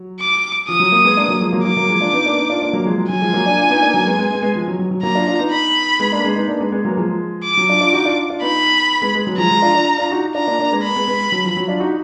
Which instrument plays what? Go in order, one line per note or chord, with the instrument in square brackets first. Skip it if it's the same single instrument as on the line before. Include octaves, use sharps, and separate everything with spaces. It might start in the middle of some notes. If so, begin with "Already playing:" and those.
Already playing: [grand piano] F#3
[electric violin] D6
[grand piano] F3 [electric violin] D#6
[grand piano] F#3
F#3 A#3
G#3 B3
A#3 D4
F#3 A#3
F3 G#3
F#3 A#3
[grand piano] F#3 A#3 [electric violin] D6
[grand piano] F#3 A#3
F3 G#3
D4 F4
B3 D#4
A#3 D4
B3 D#4
D4 F4
A#3 D4
F#3 A#3
F3 G#3
F#3
[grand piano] F#3 [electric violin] G#5
[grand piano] F3 G#3
F#3 A#3
A#3 D4
D4 F4
B3 D#4
A#3 D4
F#3 A#3
G#3 B3
G#3 B3
G#3 B3
G#3 B3
F3
F#3
F#3
F#3
[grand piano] F#3 A#3 [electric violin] A#5
[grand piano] D4 F4
D4 F4
B3 D#4
[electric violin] B5
[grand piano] G#3 B3
A#3 D4
G#3 B3
B3 D#4
A#3 D4
G#3 B3
G#3 B3
F#3 A#3
F3 G#3
[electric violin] D6
[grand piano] F#3
D4 F4
D4 F4
D#4 F#4
D4 F4
D4 F4
[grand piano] B3 D#4 [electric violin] B5
[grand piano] G#3 B3
G#3 B3
F#3
[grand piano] F3 G#3 [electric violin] A#5
[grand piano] F3 G#3
D4 F4
D4 F4
D4 F4
D#4 F#4
[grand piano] D4 F4 [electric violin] A#5
[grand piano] A#3 D4
A#3 D4
G#3 B3
[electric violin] B5
[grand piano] G#3 B3
G#3 B3
F#3
F3
F#3
D4 F4
D#4 F#4